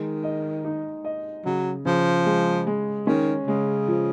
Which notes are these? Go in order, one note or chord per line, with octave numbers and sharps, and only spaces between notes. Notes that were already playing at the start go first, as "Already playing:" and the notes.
Already playing: D#3 G#3
D#5
D#4
D#5
C#3 F#3
C#3 F3
G#3
G#3
D#3 C#4
C#3 G#3
F3